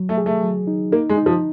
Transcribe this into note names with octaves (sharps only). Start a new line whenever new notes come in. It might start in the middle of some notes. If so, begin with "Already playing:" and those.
Already playing: F#3
A3
G#4
A3
F#3
D#4
A#3 D#4
G#3
D#4
F3